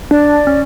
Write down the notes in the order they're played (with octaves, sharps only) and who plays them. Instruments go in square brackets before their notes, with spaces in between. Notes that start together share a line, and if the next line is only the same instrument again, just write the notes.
[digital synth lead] D4 [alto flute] D5
[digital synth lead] C#4